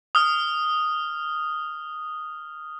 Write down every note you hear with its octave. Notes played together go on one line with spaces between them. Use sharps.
D#6 F6